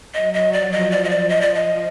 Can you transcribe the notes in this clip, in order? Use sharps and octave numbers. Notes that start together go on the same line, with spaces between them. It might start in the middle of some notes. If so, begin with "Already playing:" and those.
F#3 D#5
D#5
F3 D5
D#5
D5
D#5
D5
F3 D#5
D5
D#5